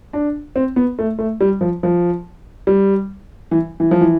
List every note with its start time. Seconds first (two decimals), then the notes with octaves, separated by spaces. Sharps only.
0.13 D4
0.56 C4
0.76 B3
0.99 A3
1.19 A3
1.41 G3
1.61 F3
1.83 F3
2.67 G3
3.51 E3
3.80 E3
3.91 F3
4.01 E3